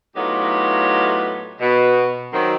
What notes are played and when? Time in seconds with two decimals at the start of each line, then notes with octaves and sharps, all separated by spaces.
0.16 A2 F#3 B3 D#4 F4 G4
1.61 B2
2.33 D#3 F#3 C4